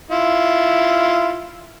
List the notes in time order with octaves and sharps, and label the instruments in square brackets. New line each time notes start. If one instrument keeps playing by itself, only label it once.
[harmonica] E4 F4